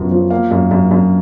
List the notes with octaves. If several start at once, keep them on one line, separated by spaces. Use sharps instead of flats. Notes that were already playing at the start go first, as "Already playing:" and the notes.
Already playing: F#2 C#3 F3 B3
F3
A#3 F5
F#2
F#2
F#2